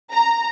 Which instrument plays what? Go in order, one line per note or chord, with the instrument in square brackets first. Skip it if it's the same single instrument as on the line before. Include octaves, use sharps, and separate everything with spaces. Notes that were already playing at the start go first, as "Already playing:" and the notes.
[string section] A#5